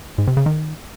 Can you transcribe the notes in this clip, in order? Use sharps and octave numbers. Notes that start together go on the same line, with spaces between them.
G#2
C3
C#3
D#3